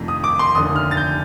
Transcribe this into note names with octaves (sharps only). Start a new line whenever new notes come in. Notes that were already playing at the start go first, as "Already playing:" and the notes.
Already playing: F2 C3 D#3 A3 D4
D#6
D6
C6
F1 D#2 D3 D#6
F6
A6
G6